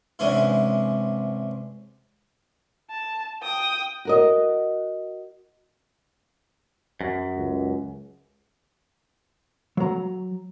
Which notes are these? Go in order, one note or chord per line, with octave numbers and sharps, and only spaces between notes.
G#2 C3 E3 C#4 D4 G#4
A5
G5 D#6
F#4 A#4 D#5
F#2
C#2
F#3 A#5